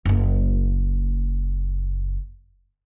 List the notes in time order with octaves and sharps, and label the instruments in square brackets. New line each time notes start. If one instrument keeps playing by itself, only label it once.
[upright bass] F#1 A#3